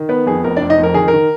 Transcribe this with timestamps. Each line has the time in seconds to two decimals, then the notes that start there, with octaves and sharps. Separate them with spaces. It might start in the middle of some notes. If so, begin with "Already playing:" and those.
Already playing: D#3
0.09 B3 B4
0.26 F2 G#4
0.44 F1 A#4
0.56 D4 D5
0.61 F1
0.70 D#4 D#5
0.78 F2
0.83 A#4
0.94 D#3 G#4
1.08 D#3 A#4